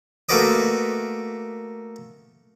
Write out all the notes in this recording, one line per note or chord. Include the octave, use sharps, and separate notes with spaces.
A3 A#3 F#4 B4 D5 D#5